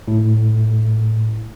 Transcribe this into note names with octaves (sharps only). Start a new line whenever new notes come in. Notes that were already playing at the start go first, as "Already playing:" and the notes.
A2